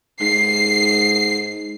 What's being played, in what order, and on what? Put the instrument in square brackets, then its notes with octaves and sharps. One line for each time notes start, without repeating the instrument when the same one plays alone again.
[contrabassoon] G#2 [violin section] C7